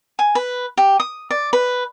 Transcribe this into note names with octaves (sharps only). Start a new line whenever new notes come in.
G#5
B4
G4
D#6
D5
B4